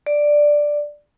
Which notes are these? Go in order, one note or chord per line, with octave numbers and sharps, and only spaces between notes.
D5